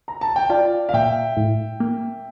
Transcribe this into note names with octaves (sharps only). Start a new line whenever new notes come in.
A#5
A5
G5
F4 D5 F5
F5
A#2 E5 G5
A2
A#3